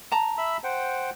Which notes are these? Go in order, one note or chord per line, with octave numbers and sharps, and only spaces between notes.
A5 A#5
E5 B5 E6
C5 F#5 G5